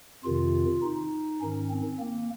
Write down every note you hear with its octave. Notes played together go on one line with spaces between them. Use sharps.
F2 C3 D#3 F4
D#4
G#2 D#3 C#4
C4
A#3